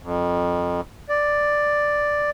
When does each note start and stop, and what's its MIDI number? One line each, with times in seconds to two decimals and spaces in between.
0.03 0.81 41
1.09 2.30 74